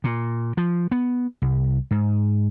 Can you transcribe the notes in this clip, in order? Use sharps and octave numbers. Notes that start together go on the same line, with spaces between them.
A#2
F3
B3
C2
G#2